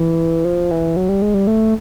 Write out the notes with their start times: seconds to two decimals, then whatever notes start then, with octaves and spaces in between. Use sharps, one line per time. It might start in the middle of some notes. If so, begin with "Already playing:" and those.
Already playing: E3
0.45 F3
0.71 E3
0.96 F#3
1.09 G3
1.22 G#3
1.34 G3
1.47 A3